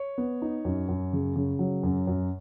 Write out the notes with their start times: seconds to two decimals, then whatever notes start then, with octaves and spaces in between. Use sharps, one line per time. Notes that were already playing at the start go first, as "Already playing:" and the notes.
Already playing: C#5
0.18 B3
0.42 D#4
0.65 F#2
0.89 F#2
1.13 C#3
1.36 C#3
1.59 F#3
1.83 F#2
2.07 F#2